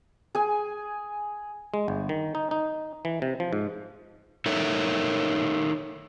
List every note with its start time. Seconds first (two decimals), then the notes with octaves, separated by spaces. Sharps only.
0.35 G#4 G#5
1.74 G#3
1.88 G1
2.09 D#3
2.35 D#4
2.51 D#4
3.05 E3
3.22 C3
3.40 F3
3.53 G#2
4.46 D#4 A4 A#4 C#5 E5